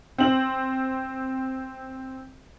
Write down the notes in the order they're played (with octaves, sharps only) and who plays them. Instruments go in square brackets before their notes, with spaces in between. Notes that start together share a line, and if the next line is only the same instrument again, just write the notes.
[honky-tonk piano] C4 F#7